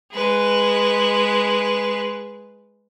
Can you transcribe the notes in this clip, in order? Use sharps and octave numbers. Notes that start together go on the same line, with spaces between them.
G#3 B4